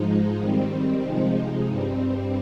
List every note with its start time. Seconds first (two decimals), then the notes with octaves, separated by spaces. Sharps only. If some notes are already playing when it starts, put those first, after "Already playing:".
Already playing: G#2 F3 G#3 D#4
0.38 D#3 G3 C4
1.02 C3 F3 G#3 D#4
1.67 G2 G3 C4